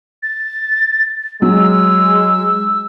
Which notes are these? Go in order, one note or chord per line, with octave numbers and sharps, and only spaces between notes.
A6
F#3 G#3 E6